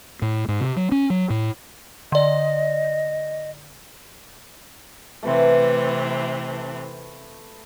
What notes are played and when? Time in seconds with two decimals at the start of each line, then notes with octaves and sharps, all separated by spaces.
0.22 A2
0.48 G#2
0.61 C3
0.76 F#3
0.92 C#4
1.10 F#3
1.30 A2
2.12 D3 D5 D#5
5.23 C3 E3 A3 C4 B4 C6